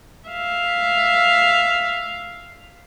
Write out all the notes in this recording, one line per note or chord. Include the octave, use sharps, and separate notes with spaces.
E5 F5